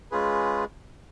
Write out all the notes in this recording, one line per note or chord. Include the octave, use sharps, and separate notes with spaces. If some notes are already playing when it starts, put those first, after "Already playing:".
G#3 C#4 F4 G#4 B4